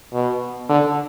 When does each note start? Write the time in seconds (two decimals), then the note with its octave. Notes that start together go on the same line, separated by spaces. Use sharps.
0.13 B2
0.69 D3